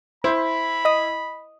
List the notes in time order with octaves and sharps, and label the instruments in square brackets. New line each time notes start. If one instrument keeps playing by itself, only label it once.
[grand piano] E4 [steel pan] C5 [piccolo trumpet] B5
[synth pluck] D#5 D#6